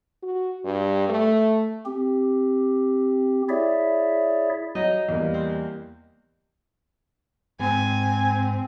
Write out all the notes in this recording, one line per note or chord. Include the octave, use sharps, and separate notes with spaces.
F#4
G2
A3
C4 G4
E4 G#4 C#5 D5 E5
F#3 D#4 D#5
E2 G3 A#3
C4
G#2 C4 G#5